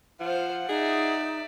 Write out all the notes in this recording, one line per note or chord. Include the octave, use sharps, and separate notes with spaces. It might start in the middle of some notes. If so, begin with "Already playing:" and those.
F3 F4 C5 F#5
D#4 G#4 D5 E5